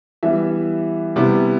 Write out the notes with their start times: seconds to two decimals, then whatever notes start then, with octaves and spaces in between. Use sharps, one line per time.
0.23 E3 G3 B3 E5
1.16 C3 G3 B3 E4